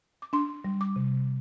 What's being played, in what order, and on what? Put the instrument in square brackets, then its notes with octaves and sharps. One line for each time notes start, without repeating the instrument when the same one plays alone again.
[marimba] D6
D4 C6
G3
D6
C3